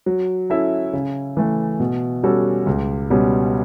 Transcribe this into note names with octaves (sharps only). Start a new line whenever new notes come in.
F#3
C#4 E4 A4 E5
C#3
E3 A3
B2
G3 C#4 F#4 A4
C#2
B2 G3 C#4